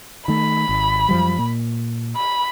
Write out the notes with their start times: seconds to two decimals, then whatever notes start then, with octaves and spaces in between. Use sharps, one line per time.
0.28 D#3 A3 B5
0.69 G#1
1.09 F#2 F3 G3
1.38 A#2
2.16 B5